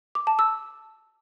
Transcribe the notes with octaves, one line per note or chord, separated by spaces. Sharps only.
D6
A5
E6